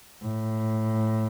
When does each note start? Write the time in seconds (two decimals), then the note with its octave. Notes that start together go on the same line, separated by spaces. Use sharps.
0.22 A2